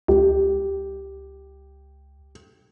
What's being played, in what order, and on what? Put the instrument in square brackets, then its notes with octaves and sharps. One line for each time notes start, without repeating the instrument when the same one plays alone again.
[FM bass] C#2 [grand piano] G4